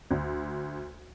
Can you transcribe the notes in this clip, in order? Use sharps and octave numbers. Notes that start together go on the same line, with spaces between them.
D2